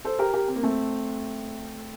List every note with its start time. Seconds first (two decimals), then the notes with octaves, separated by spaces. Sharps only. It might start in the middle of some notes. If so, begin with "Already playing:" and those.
0.05 A4 C5
0.19 G4 A#4
0.33 G4 A#4
0.48 C4
0.56 A#3
0.63 A3 C4